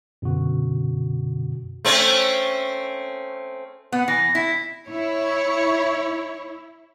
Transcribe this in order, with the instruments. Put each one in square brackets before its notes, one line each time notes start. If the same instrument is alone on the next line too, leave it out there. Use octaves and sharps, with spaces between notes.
[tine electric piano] F#2 B2 D3 F#4
[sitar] A3 C4 C#4
[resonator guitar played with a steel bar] B3 [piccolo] F#5
[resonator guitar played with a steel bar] E3 [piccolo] A#6
[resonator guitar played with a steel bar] E4 [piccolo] B6
[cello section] E4 [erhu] C#5